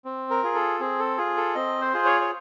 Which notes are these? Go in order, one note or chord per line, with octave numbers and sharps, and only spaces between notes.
C4
A#4
F4 G#4
A4
C4 G#4
A4
F4 G#4
A4
C4 D#5
C5
F4 G#4
C#5
C#5